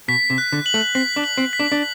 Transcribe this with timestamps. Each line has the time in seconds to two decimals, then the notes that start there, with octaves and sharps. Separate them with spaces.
0.08 B2 B6
0.30 C3
0.38 F#6
0.52 D3
0.66 F#7
0.74 A3
0.95 C4 B6
1.16 D4
1.24 F#7
1.38 C4
1.53 B6
1.60 D4
1.72 D4